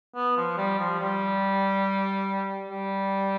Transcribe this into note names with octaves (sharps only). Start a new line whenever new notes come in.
B3
F3
G3
F3
G3
G3